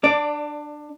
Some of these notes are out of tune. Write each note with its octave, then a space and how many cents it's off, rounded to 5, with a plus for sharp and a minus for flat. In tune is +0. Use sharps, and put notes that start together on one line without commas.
D4 +20 D5 +0